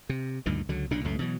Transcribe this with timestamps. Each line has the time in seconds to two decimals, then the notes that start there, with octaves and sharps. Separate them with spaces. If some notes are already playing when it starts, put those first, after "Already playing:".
0.09 C3
0.46 D2 G2 A#2 D#3
0.69 C#2 D3 F#3
0.91 B1 A#2 C#3 D4
1.04 C#2 F#2 A2 A3
1.19 B2 E3 F#3